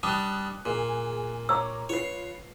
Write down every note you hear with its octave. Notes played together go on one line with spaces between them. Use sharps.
G3 D4 D#6 F#6
A#2 G#4
C#5 A#5 D6 E6
F4 B4 C#5 C7